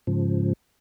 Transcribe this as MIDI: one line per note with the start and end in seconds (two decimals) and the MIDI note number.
0.07 0.53 44
0.07 0.53 49
0.07 0.53 53